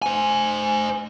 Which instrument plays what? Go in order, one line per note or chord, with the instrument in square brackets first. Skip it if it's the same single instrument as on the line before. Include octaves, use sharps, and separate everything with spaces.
[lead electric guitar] C5 G#5